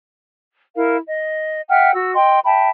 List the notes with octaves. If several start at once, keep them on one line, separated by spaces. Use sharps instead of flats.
E4 A#4 F5
D#5
E5 F#5 G5 F6
F#4 E6
D#5 G5 C6
E5 G5 A5 B5